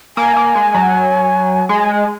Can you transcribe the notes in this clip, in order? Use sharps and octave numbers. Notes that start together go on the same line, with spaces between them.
A#3 G#5
A#3
G#3
F#3
G#3 G#5